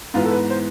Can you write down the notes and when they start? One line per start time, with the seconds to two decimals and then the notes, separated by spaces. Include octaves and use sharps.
0.14 G#2 E3 B3 F4
0.25 A4
0.31 B4
0.50 C5